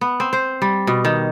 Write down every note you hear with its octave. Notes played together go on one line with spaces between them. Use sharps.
B3
C4
C5
G3
B2
D#3